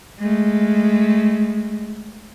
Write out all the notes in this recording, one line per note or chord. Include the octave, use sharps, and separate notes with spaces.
G#3 A3